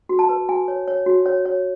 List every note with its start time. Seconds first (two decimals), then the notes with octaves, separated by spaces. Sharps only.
0.09 F#4
0.19 A5
0.29 B4
0.49 F#4 G#5
0.68 C#5
0.88 C#5
1.06 F#4
1.26 C#5
1.45 C#5